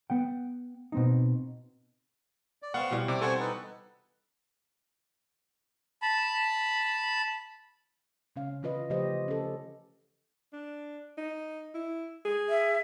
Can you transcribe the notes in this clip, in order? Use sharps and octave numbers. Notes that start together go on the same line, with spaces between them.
B3 F#5 G5
B2 C4 D#4
D5
B3 C4 F5 F#5 C#6
B2 E3 G3
C3 D6
G4 A4 C5 F#5 G#5 C#6
D#4 B4
A5 B5
C#3 C#4 F5
D3 E3 F4 B4 D#5
C#3 F3 A3 G4 C5 D#5
C#4 A4
D4
D#4
E4
G#4
E5